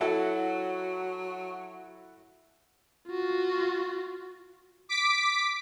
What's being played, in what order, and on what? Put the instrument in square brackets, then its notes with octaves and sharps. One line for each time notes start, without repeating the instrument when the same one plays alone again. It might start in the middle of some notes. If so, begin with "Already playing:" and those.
[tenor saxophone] F#3 [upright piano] E4 F#4 A4
[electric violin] F4 F#4
[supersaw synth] D6 B6 D7